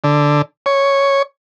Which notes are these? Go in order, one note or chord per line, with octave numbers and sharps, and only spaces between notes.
D3
C#5